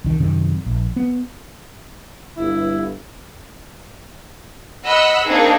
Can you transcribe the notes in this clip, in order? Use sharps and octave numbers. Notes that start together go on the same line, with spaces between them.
C2 D#3
F#2 C3 D#3
A#1
B3
G1 E4
D#5 F#5 B5 E6 F#6
A#3 C4 D4 D#4 G#4